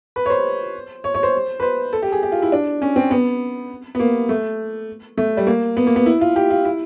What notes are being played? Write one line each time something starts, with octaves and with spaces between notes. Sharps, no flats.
B4
C#5
C5
C#5
C#5
C5
B4
C5
A4
G4
G#4
G4
F4
E4
D4
C#4
C4
B3
B3
A#3
A3
A3
G3
A#3
B3
A#3
B3
E4
F4
G4
F4
E4